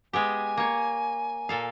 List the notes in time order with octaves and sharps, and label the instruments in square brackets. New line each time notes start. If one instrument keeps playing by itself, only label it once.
[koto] G#3 B3 G4 [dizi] G#5
[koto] A#3 C#5
A#2 A4 F5